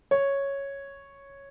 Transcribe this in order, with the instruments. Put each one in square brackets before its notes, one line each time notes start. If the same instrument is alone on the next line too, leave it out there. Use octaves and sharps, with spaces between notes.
[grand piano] C#5